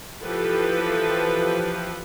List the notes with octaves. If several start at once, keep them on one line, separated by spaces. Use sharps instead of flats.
E3 F3 G4 A4 B4